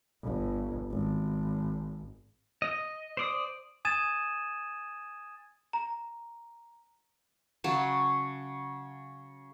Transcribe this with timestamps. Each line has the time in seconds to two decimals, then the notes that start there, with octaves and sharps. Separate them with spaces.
0.24 G1
0.91 G#1
2.62 D#5
3.17 C5 D5 D#6
3.85 G#5 D#6 G#6 A6 D#7 E7
5.73 A#5
7.64 C#3 F#3 A5